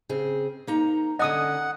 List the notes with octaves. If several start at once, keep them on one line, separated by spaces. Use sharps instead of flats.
C#3 C4 G#4
A#3 D#4 A#5
D3 C#4 D#5 F#5 G#5 D#6